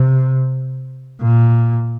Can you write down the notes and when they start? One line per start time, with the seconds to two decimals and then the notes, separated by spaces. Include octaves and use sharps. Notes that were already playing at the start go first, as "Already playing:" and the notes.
Already playing: C3
1.22 A#2